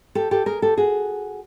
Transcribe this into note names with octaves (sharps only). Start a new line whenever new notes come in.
G4 A4
G4 A4
G#4 A#4
G4 A4
F#4 G#4